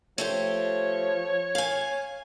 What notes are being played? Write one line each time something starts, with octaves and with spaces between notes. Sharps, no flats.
F3 A3 G4 C5 C#5
F5 G#5